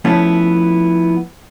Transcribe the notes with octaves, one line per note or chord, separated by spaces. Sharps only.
F3 A3 B3 C#4 E4